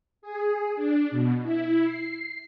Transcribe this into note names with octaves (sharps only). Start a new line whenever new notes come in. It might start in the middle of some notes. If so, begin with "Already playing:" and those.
G#4
D4
B2
E4
C7